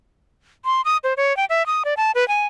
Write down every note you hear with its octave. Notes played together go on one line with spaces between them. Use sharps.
C6
D#6
C5
C#5
G5
E5
D#6
D5
A5
B4
G#5